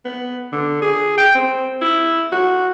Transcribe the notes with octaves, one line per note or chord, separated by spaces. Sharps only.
B3
D3
G#4
G5
C4
E4
F#4